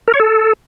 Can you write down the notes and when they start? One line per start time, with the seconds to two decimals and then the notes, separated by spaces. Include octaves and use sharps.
0.08 A#4
0.14 C#5
0.20 A4